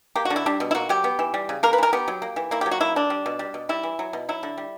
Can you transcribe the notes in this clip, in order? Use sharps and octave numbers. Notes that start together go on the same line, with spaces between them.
A#3 G4
D3 F#4
E4
G3 D4
B2
E4
A#3 F#4
F#3 G4
B3
E3
G3
C#3
A#3 A#4
B4
E3 A#4
B3 G4
F#3
A#3
E3
A#3 E4
F#3 G4
F#4
A#3 E4
D3 D4
G3
B2
G3
B2
G3 E4
E3
F#3
B2
F#3 E4
D3
G3